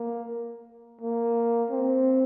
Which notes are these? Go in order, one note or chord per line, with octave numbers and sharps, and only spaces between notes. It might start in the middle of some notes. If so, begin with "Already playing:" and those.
Already playing: A#3
A#3
C4